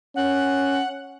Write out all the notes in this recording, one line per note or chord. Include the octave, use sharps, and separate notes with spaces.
C#4 F#5